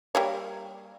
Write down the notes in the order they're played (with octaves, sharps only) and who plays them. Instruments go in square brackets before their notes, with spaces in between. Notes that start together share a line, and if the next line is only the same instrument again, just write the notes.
[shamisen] G3 A#3 C#5